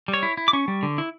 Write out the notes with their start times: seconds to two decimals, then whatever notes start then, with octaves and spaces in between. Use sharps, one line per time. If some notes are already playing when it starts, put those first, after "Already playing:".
0.08 G3
0.14 C#5
0.23 E4
0.37 E4
0.48 D6
0.53 C#4 C#6
0.68 G3
0.83 D3
0.98 E4